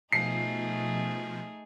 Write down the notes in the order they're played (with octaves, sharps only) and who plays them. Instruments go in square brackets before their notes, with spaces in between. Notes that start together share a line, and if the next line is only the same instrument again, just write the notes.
[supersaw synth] B2 F3 [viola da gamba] A3 D#4 G#4 [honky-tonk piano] C7